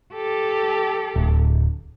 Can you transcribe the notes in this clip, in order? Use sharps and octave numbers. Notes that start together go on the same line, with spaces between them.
G4 A4
D1